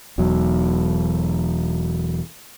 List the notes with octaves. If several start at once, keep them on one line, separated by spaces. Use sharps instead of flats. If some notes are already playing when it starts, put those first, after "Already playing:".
E1 E2 F#3